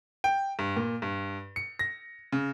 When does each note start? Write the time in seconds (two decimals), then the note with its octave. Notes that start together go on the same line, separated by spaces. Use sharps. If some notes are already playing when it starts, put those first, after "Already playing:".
0.24 G5
0.59 G2
0.76 A#2
1.02 G2
1.56 C#7
1.79 A#6
2.32 C#3